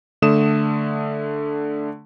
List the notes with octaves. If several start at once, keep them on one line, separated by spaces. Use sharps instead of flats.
D3 A3 D#6 E7